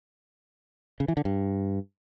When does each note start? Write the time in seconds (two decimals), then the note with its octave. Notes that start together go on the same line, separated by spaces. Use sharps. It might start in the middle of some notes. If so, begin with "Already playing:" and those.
1.00 C#3
1.08 E3
1.17 D3
1.25 G2